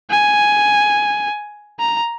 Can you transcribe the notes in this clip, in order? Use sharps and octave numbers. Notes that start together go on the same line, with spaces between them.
G#5
A#5